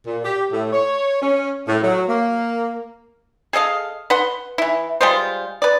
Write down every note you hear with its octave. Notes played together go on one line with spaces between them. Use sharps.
A#2
G4
A2
C#5
C#4
A2
F#3
A#3
G#4 A4 D#5 F5
B4 F#5 C6
E3 E4
G3 G#3 F4 C5
B4 D5